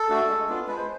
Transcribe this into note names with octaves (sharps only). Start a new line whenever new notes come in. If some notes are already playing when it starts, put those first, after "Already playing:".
Already playing: A4
A3 D4 F#4
G#3
B3 D4 F4
G#3 B4
C5